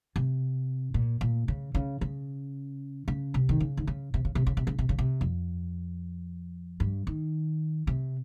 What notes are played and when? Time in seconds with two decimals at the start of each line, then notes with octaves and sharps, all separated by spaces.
0.16 C3
0.94 A#2
1.21 A#2
1.48 C#3
1.75 C#3
2.01 C#3
3.08 C#3
3.34 C3
3.49 D#3
3.60 C#3
3.77 D#3
3.87 C#3
4.14 C3
4.25 C#3
4.35 C3
4.47 C#3
4.57 C3
4.67 C#3
4.79 C3
4.89 C#3
4.99 C3
5.21 F2
6.80 G2
7.07 D#3
7.87 C3